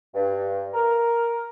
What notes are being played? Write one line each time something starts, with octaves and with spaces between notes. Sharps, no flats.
G2
A#4